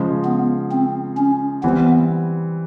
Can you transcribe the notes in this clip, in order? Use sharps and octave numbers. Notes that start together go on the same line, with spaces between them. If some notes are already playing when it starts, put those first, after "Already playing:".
Already playing: C#3 F3 G#3
B3
C4
C#4
E3 G3 B3 C4